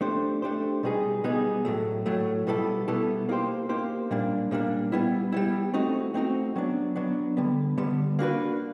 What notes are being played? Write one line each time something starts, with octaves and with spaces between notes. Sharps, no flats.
A3 D4 G4 C5
A3 D4 G4 C5
B2 G3 B3 D#4 G#4
B2 G3 B3 D#4 G#4
A2 F#3 A3
A2 F#3 A3
B2 G3 B3 E4 A4
B2 G3 B3 E4 A4
A#3 D#4 G4 C5
A#3 D#4 G4 C5
A#2 G3 A#3 D4
A#2 G3 A#3 D4
G3 B3 E4
G3 B3 E4
A3 C4 D#4 F#4
A3 C4 D#4 F#4
F#3 B3 D4
F#3 B3 D4
D3 G3 B3
D3 G3 B3
A#3 D4 F#4 B4